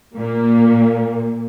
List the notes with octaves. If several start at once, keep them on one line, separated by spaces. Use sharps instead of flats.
A#2 A#3